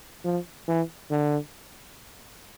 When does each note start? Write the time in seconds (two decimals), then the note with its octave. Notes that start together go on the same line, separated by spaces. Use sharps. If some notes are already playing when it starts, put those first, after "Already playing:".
0.25 F3
0.68 E3
1.11 D3